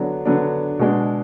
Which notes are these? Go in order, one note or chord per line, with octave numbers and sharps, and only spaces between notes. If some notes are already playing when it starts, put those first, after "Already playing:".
Already playing: D3 F#3 B3 D4
D3 F#3 B3 D4
B2 G#3 D4